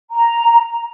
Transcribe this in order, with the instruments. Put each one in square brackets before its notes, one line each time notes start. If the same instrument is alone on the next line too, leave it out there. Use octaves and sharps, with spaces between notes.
[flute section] A#5